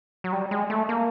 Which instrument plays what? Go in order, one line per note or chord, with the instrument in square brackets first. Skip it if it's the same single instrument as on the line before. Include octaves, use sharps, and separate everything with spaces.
[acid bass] F#3
G3
G#3
A3
A#3